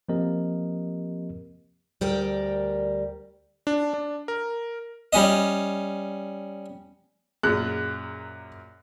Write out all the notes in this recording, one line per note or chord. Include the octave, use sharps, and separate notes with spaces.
F3 A#3 C4 G4 A#4 D#5
D2 G3 A#4 G5
D4
D4
A#4
G3 C#4 D#5
F#2 A#2 G#4 F#6